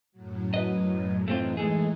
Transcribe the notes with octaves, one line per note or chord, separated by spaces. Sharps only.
F#2 A2 F#3
B4 D#5
E3 A3 C4 D#4 F4
G#3 A3 G#4